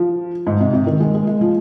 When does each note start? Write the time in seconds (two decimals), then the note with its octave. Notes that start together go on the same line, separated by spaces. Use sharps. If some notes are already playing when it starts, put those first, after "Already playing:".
Already playing: F3
0.47 G#2
0.61 C3
0.73 C3
0.87 D#3
1.00 G#3
1.15 G#3
1.27 G#3
1.41 F3